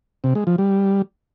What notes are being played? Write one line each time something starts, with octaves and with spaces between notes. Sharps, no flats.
C3
G#3
F3
G3